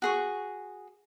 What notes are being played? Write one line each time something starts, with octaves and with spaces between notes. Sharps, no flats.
F#4 G#4 C#6